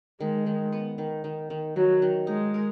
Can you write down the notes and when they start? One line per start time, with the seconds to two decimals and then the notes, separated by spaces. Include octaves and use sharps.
0.20 D#3 G#3
0.46 D#3
0.72 B3
0.98 D#3
1.24 D#3
1.50 D#3
1.76 D#3 F#3
2.02 D#3
2.27 G#3 D#4
2.54 A#4